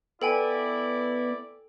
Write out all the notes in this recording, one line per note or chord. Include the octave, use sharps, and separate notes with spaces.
B3 E4 A4 D5 G5 G#5